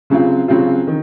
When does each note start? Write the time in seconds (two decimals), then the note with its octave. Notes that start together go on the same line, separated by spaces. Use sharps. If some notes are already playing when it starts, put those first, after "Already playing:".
0.10 C#3 F#3 C4 F4
0.48 C#3 F#3 C4 F4
0.87 D#3